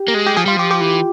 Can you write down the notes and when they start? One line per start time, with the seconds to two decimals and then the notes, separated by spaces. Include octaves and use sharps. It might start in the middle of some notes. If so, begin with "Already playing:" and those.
Already playing: G4
0.08 A#3
0.14 G#3
0.26 G4
0.36 F3 G#4
0.46 G3 F4
0.57 F3 G4
0.71 G4
0.81 E3